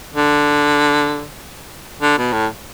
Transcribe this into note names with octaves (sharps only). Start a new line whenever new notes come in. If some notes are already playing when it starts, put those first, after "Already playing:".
D3
D3
B2
A2